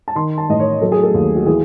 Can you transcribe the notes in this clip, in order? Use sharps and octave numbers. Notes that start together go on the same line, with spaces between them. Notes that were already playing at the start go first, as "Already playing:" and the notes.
A5
D#3 C6
A5
A1 D#5
C#5
F#3 A4
G#4
A4
D#2
F#4
E3 G#4